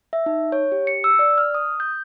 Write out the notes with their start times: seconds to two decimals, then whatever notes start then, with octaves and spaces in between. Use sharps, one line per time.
0.13 E5
0.26 D#4
0.52 C#5
0.72 G4
0.87 C#7
1.04 E6
1.19 D5
1.38 F6
1.54 D#6
1.80 G6